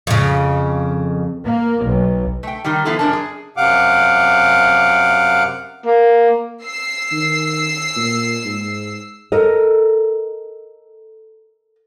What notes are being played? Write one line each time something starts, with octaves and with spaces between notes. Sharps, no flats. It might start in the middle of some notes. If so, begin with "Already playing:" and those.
F2 C#3
A#3
B1
A3 G5
D#3 G3
F3 B3 E4 F4 A4
F#2 D4 A#4 A5
G#4
F#2 C3 F5 F#5 D6
A#3
E6 C7
D#3
A#2
G#2
A4 A#4 D#5